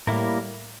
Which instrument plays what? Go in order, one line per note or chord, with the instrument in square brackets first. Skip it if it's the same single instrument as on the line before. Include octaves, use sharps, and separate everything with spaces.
[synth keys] A2 [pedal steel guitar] G3 A#3 E4 A#4